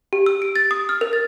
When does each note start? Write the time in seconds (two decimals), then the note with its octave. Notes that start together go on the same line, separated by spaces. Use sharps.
0.13 G4
0.26 E6
0.42 D7
0.56 A6
0.71 D#6
0.89 F6
1.01 A#4
1.13 A6